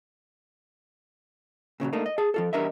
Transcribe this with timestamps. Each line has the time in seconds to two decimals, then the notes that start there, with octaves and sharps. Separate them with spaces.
1.80 A#2 C#3 E3 F#3
1.93 A3 A#3 D4 D#4
2.06 D#5
2.18 G#4 A5
2.34 F3 F4 A4
2.53 E2 G3 D4 A#4 D#5 E5